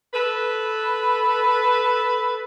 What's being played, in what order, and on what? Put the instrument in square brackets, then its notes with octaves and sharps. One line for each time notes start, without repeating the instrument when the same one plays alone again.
[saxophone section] A4 B4